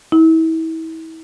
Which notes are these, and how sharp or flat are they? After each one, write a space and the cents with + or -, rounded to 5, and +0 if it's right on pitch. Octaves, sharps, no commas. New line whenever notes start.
E4 -35